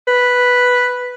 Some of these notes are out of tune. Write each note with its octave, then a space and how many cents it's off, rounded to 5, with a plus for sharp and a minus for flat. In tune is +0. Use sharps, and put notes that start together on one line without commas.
B4 +0